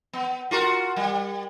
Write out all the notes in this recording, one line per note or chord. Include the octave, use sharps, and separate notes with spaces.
B3
F4 F#4 A#4
G3